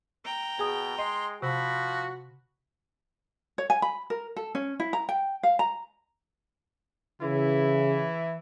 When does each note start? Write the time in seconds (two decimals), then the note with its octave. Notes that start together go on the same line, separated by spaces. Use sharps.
0.25 G5 A#5
0.59 B2 G#4 G#5 D#6
0.98 G#3 D#5 C6
1.42 C3 F3 F#4 B5
3.58 C#5
3.70 G#5
3.82 B5
4.10 A#4
4.36 A4
4.55 C#4
4.80 E4
4.93 A#5
5.09 G5
5.43 F5
5.59 A#5
7.22 C#3 E3 E4